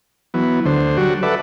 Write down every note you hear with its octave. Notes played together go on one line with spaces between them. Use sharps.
E3 F#3 B3
D2 D3 C5
F#3 G3 D4 F#4
A4 B4 D5 E5 F#5